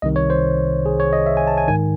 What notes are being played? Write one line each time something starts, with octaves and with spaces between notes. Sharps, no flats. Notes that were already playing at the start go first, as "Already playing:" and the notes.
C2 C3 D#3 D#5
C#5
C5
G#4
C#5
D#5
E5
G#5
A5
G#5
G#2 D#3 G#5